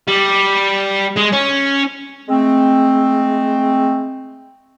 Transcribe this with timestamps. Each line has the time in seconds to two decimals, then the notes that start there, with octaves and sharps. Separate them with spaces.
0.07 G3
1.16 G#3
1.32 C#4
2.28 G#3 A3 C4